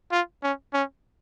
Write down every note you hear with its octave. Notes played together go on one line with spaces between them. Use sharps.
F4
C#4
C#4